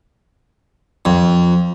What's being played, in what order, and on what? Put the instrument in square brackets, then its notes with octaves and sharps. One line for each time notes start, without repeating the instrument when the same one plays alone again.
[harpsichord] F2